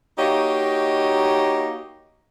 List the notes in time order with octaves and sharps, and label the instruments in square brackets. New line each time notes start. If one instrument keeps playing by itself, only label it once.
[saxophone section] A#3 D#4 F#4 G4 C#5 D#5